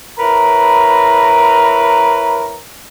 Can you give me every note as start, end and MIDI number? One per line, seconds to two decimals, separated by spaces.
0.19 2.58 64
0.19 2.58 70
0.19 2.58 71
0.19 2.58 73
0.19 2.58 82